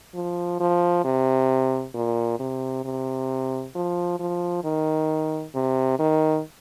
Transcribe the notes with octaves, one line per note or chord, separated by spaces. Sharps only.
F3
F3
C3
A#2
C3
C3
F3
F3
D#3
C3
D#3